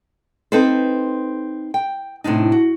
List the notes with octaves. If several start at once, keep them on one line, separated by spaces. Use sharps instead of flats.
C4 D#4 A4 B4 C5
G5
A2 C3 D4 D#4
F#4